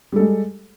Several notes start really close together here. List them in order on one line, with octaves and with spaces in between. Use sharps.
G3 A4 G#3